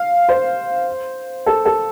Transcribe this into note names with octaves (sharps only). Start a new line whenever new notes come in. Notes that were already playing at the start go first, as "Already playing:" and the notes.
Already playing: F5
C5
A4
A4